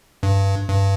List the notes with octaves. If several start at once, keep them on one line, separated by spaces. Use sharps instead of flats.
G2
G2